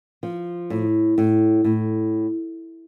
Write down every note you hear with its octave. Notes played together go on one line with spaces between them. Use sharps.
F3
A2
A2
A2